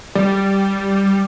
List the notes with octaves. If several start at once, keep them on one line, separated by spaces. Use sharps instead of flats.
G3